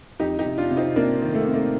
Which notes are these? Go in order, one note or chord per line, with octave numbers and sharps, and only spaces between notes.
F2 D#4 G4
D#4 G4
C3
D4 F4
C3
C4 D#4
C3 A#3 D4
D#3
A3
C3
A#3